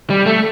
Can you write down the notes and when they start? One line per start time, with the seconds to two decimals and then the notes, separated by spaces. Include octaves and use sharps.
0.10 G3
0.26 A3